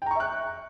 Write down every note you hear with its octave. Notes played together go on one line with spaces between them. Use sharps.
E5 G5 A#5 C#6 F#6